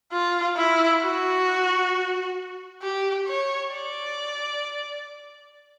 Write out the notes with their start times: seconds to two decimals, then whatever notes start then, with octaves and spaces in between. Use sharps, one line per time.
0.12 F4
0.56 E4
1.01 F#4
2.82 G4
3.27 C#5
3.72 D5